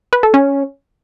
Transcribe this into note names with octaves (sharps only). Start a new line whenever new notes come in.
B4
A4
C#4